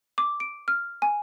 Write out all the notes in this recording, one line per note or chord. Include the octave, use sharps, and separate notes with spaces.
D6
D7
F6
G#5